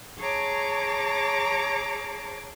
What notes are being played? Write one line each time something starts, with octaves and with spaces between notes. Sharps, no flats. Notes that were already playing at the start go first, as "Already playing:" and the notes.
G#4 C#5 A5 A#5 D6